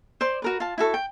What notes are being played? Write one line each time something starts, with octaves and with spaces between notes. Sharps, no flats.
C5 D5 C6
F#4 A#4 B4
F4 A5
E4 F#4 A4 C#6
G5